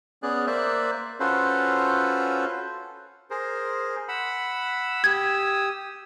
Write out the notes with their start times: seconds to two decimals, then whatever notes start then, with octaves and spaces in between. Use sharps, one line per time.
0.23 B3 C#4 G#4 D5 F#6
0.47 A#3 C5 D5 E5 F#6
1.20 C#4 F4 F#4 A4 B4 C5
3.30 G#4 A#4 C5
4.08 F#5 B5 E6
5.04 G4 D#6 E6 G#6